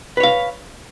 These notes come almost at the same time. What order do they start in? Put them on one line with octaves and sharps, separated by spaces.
B4 C#5 F5